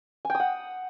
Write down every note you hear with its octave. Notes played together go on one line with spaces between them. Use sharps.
G#5
G5
D#6
F#5